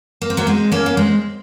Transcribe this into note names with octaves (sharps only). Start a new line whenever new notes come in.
A#3
C4
F#3 A#3
G#3 C4
A#3 C#4
A#3
G#3 C4